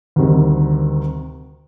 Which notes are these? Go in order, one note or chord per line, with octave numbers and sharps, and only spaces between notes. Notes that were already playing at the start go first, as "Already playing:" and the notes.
D2 C3 D#3 G3